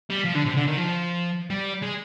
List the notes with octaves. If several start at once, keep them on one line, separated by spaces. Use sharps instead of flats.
G3
F3
D3
C3
D3
D#3
F3
G3
G#3